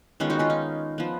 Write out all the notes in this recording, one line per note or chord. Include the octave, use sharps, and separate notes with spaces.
D#3 G#3 B3 C#4 F4
D#4 F#4
C#4 F4
D#4
F3 B3